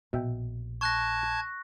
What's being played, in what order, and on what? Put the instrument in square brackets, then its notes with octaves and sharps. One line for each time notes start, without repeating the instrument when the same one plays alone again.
[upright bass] A#1 [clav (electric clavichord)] B2 E5 G5
[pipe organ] A5 G#6 [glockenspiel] C#6 F#6 A#6